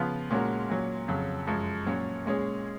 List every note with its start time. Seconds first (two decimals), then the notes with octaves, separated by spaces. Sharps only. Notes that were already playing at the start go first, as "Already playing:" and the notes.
Already playing: C#3 F3 B3 F4
0.30 A#2 G#3 C#4 F#4 A#4
0.69 A#2 F#3 C#4
1.08 F2 C#3 F#3
1.47 F#2 F3 G#3
1.86 A#2 F#3 C#4
2.26 A#2 G#3 C#4 G#4